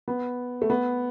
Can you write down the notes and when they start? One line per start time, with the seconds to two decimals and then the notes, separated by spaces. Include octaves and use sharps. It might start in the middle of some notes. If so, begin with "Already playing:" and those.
0.08 B3
0.62 A3
0.70 B3